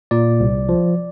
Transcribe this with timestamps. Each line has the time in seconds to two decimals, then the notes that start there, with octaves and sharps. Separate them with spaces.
0.11 A#2 D5
0.40 C2
0.69 F3